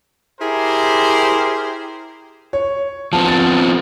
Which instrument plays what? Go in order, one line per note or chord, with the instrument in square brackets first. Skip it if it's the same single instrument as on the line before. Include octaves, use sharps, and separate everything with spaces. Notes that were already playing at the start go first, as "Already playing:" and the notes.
[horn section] E4 G4 G#4 A#4 C5
[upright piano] C#5
[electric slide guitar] F3 B3 C4 [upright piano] A5
[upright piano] A6